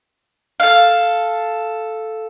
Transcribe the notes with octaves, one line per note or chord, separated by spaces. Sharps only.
A4 F5